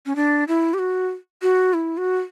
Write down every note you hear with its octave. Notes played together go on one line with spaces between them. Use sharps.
C#4
D4
E4
G4
F#4
F#4
E4
F#4